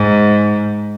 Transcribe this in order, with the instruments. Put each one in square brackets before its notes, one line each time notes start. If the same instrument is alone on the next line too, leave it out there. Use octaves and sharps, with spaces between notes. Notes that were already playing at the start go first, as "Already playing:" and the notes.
Already playing: [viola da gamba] G#2